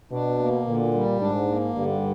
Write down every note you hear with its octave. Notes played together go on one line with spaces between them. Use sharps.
B2 D4
A#3
A#2 D3
G3
G#2 D4
A#3
G2 D3